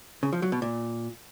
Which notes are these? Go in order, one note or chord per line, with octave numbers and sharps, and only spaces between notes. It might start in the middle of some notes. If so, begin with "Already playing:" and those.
C#3
F3
F#3
B2
A#2